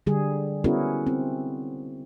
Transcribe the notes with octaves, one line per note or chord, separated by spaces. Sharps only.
D3 G3 G#4
B3 C#4 E4 F#4 G#4 A#4
C4